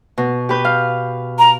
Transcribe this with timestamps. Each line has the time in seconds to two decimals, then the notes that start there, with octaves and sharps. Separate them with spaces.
0.18 B2
0.49 G4 B4 G6
0.65 F5
1.39 A#5